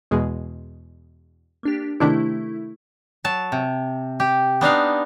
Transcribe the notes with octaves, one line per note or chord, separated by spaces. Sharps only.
E2 B2 G#3
A#3 D4 G4
C3 D#3 A3 D4 E4
F#3 A5
C3
G4
B3 D4 D#4 F5